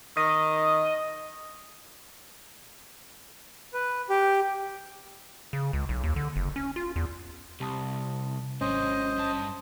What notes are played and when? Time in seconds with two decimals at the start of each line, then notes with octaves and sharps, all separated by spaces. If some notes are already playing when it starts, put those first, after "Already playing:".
0.17 D#3 D#5
3.73 B4
4.10 G4
5.53 C#3
5.73 C#2
5.89 B1
6.04 D#2
6.16 D3
6.36 F#1
6.56 C#4
6.76 F4
6.96 E2
7.60 C2 C3 A5 D#6
8.61 G#1 G#2 F#3 C#4 C5 D#5
9.17 G2 A5